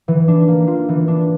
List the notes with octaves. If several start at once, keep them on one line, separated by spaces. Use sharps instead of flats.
E3
D4
A#3
F4
E3
D4